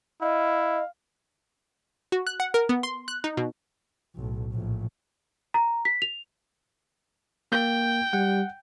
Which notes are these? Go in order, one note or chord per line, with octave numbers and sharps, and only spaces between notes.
E4 D#5 F5
F#4
F#6
F#5
A#4
B3
C6
F#6
D#4
B2
B1 A2
A#1 A2
A#5
B6
F7
A#3 G5 G6
G3 F#5